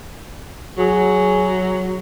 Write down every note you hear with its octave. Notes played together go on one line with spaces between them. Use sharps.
F#3 G#4